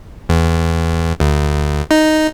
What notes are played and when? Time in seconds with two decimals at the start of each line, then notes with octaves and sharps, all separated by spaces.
0.29 E2
1.20 D2
1.91 D#4